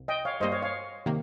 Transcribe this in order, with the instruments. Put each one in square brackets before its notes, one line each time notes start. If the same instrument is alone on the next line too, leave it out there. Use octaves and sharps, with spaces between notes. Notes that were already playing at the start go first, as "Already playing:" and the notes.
Already playing: [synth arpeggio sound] C2
[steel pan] D#5 G5
C#5 F5
[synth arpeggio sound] G2 G3 A#3 [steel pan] C5 D#5
[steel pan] C#5 F5
C#5 F5
[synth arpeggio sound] C3 D#3 A#3